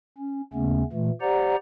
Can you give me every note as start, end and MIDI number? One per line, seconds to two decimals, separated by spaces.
0.18 0.42 61
0.53 0.83 39
0.53 0.83 49
0.53 0.83 57
0.53 0.83 59
0.53 0.83 61
0.92 1.10 46
0.92 1.10 52
0.92 1.10 57
1.21 1.56 67
1.21 1.56 72
1.21 1.56 74
1.21 1.56 78
1.21 1.56 82